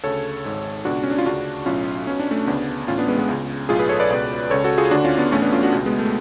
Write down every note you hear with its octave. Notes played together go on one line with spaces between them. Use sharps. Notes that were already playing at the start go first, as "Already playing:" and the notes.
D2 C#3 A4 C#5
G#1 G#2
C#2 B2 D4 F#4
C#4
D4
F4
D2 C#3 D4 F#4
B1 A2 C#4 F4
B1 B2 C#4
D4
A3 C#4
D2 C#3 B3 D4
A1 A2 C#4 F4
B3 D4
G#3 B3
G#3 B3
C#2 C#3
B1 A2 F4 G#4
G#4 B4
A4 C#5
B4 D5
C#2 B2
C#2 C#3 A4 C#5
F#4 A4
F4 G#4
D2 D3 D4 F#4
C#4 F4
B3 D4
A1 A2 A3 C#4
B3 D4
C#4 F4
D4 F#4
C#2 B2
G#3 B3
A3